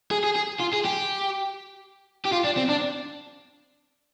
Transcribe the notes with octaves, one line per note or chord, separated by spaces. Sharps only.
G#4
G#4
G#4
F4
G#4
G4
G4
F4
D4
C4
D4